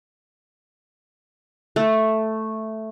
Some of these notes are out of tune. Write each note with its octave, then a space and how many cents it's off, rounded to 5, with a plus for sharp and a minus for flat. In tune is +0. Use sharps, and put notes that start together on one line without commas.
A3 +0